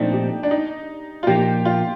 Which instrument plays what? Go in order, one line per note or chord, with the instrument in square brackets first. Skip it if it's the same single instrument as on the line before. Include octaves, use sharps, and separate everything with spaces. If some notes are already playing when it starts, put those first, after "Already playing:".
Already playing: [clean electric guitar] A#2 F3 A3 C4 [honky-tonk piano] D4 D#4
[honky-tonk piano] G4
D4
D#4
F4
[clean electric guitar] A#2 F3 A#3 D#4 [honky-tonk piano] G4
[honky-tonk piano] F4